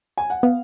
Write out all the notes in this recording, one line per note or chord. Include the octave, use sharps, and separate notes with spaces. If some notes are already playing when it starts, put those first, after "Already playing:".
G#5
F#5
B3 F5